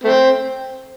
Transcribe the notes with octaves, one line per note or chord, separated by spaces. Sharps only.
A3 C4